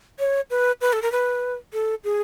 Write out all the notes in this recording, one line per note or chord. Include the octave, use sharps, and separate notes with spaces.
C#5
B4
B4
A4
A#4
B4
A4
G#4